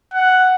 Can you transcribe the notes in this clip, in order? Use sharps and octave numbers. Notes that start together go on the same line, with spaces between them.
F#5